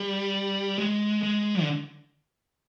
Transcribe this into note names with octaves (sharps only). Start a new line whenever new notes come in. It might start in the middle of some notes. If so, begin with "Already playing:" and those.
Already playing: G3
G#3
G#3
D3